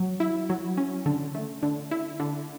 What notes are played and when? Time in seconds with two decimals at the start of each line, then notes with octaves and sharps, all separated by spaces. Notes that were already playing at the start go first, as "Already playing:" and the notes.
Already playing: F#3
0.20 E4
0.50 F#3
0.77 C#4
1.06 D3
1.35 A3
1.63 D3
1.91 E4
2.20 D3